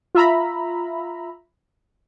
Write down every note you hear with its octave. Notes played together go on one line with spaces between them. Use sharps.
F4 E5 A#5 B5